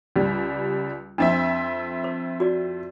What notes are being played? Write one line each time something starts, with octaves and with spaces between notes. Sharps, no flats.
C#2 G3
F2 C4 D4 D#5 E5
C5
F#4 D5